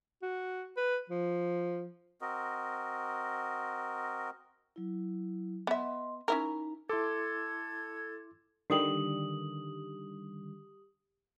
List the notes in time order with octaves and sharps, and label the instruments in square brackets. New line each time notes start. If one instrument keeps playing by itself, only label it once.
[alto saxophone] F#4
B4
F3
[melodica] C4 F#4 A#4 D#5
[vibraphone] F#3 E4
[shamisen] B3 E5 [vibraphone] D#5 C6
[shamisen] C#4 E4 A#4 [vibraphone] D#4
[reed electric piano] E4 C6 D6 [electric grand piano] A4 [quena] G#6
[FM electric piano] D3 D#3 G3 [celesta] G4 D#6 F#7